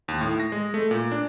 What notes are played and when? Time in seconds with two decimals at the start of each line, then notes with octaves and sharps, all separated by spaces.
0.08 D#2
0.21 A2
0.40 A#6
0.52 G#3
0.74 A3
0.91 A#2
1.12 D4